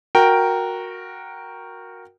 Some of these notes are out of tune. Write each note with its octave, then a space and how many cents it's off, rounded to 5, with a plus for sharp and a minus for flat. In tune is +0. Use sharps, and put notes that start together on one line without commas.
F#4 -15 A#4 +0 G5 -5